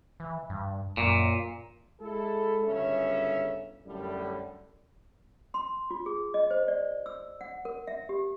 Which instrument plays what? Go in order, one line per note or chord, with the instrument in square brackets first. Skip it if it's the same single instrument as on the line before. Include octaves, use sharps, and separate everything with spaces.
[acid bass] E3
G2
[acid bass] F#2 [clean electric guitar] A#2
[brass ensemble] G#3 E4 A4
G1 F#2 C#3 C#4 E5
F#2 A2 D3 G3
[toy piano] C6
F4
G#4
D#5
C5
D5
E6
F#5
A#4
E5
G4